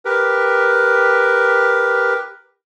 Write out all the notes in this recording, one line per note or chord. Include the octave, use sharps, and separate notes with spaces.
G4 A#4 B4